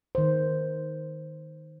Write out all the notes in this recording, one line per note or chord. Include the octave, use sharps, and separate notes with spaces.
D#3 C5